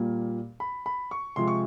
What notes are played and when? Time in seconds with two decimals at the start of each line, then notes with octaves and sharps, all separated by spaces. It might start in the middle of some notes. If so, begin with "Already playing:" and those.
Already playing: A#2 G3 A#3
0.60 B5
0.86 B5
1.11 C#6
1.36 C3 F3 G#3 C6
1.48 C#6